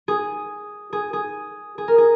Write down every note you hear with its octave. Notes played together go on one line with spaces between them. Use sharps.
G#4
G#4
G#4
G#4
A#4
G#4